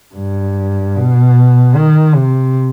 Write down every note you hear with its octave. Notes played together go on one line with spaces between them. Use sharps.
G2
B2
D#3
C3